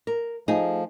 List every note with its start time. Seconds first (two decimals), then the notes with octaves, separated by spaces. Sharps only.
0.07 A#4
0.48 F3 A3 D#4 G#4